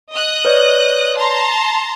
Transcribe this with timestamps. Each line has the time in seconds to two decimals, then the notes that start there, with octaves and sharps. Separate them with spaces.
0.12 D#5 D#6 F#6
0.45 B4 C#5 D5
1.16 A5 A#5 C6